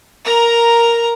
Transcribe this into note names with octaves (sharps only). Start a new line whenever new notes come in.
A#4 A#5